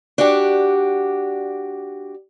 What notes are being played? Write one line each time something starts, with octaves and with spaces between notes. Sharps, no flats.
D4 F#4 G4